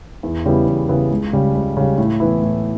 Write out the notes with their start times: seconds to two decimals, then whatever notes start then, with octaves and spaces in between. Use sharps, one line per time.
0.23 E2
0.46 C#3 G3 B3 E4
0.67 E2
0.89 C#3 G3 B3 E4
1.11 C#2
1.33 C#3 G3
1.55 C#2
1.77 C#3 G3
1.98 A2
2.20 E3 B3 E4
2.43 A2